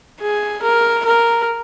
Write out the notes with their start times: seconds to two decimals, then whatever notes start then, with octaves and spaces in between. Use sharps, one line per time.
0.21 G#4
0.63 A#4
1.06 A#4